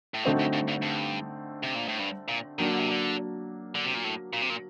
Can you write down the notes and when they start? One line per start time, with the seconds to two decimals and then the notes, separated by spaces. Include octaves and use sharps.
0.14 A2
0.23 G2 D3 A3 C4 D#4 F#4
0.39 F#2
0.53 G2
0.68 G2
0.82 G2
1.63 C3
1.75 A#2
1.88 A2
1.99 G2
2.28 A#2
2.58 D#3 F#3 A#3 D4
2.68 D3
2.79 C3
2.89 D3
3.75 D3
3.85 C3
3.95 A#2
4.04 A2
4.33 A#2
4.42 C3
4.50 A#2